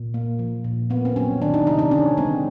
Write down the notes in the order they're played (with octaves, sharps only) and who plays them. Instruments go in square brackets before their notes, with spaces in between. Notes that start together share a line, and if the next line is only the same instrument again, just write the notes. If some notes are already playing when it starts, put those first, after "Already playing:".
Already playing: [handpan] A#2
A#3
F3
A#2
A#3 B3
C4
F#3 C#4
D#3 D4
D#4
C3 D#4
D4
D3 C#4
G#3 C4